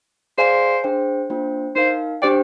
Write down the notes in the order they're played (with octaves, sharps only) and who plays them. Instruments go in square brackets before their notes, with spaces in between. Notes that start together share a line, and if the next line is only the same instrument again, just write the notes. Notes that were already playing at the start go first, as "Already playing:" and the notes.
[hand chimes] G#4 D5 F5 G#5 [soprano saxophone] C5
[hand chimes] D4 G#4 C5 G5
A#3 D4 F4 C5 G5
[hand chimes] D#4 A#4 F5 [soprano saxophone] C5
[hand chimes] D4 G4 C5 G5 [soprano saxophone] D5